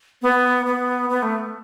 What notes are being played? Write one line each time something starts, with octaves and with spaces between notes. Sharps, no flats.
B3
B3
B3
A3